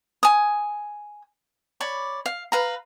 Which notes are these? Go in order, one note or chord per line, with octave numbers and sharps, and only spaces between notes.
G#5 D#6
C#5 D5 B5
F5
B4 F5 A#5